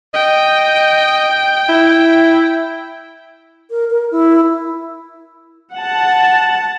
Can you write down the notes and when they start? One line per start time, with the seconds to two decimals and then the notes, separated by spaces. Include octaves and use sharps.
0.14 D#5 G5
1.69 E4
3.71 A#4
3.90 A#4
4.11 E4
5.75 F#5 A5